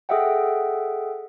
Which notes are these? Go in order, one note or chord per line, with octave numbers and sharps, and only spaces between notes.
G#4 A4 D#5 E5 F#5 G5